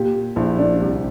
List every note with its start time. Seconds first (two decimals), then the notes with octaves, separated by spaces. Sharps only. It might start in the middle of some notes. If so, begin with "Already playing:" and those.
Already playing: A#2 G4
0.36 A#1 E4
0.58 D4
0.81 C2 D4